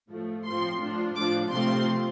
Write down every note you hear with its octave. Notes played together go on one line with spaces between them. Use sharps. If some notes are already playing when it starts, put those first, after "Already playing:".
A2 F3 A3
A2 F3 C4 C6
A2 F3 D4 F4
A2 F3 D4 F4 D6
C3 F3 A3 C4 F4 C6